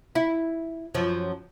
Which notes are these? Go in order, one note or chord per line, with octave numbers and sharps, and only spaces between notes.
E4
F#2 F3